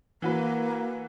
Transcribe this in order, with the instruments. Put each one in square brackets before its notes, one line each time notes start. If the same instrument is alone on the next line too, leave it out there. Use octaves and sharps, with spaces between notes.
[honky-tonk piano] E3 F#4 B4 [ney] A#3